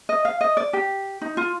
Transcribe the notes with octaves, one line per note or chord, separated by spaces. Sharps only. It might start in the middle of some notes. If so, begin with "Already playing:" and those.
D#5
F5
D#5
D5
G4
D#4
F4